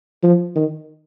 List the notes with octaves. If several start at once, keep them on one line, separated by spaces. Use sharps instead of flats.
F3
D#3